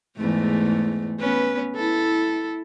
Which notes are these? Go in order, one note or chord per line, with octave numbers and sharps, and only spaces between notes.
E2 G#2 A3
B3 C#4 B4
E4 A4